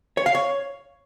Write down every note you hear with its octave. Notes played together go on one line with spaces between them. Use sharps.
C#5
F5
C#5